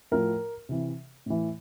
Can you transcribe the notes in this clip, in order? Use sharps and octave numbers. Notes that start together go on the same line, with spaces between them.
A2 F3 A#4
C3 E3
A2 E3